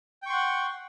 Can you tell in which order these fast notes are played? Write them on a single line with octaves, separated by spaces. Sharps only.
G5 C#6 C6 F#5